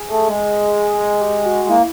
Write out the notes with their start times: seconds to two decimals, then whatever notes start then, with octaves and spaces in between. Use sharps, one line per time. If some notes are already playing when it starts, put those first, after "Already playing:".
Already playing: G#4
0.09 A3
0.27 G#3
0.98 G#4
1.21 G4
1.46 F#4
1.69 A#3 E4